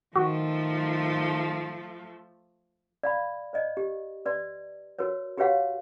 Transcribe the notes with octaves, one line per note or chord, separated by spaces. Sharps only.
D#3 F3 A3 F#4
D5 F5 B5
C5 D5 D#5
G4
B4 D5 C6
F#4 A#4 B4 C#5
F#4 G4 B4 C#5 F5 F#5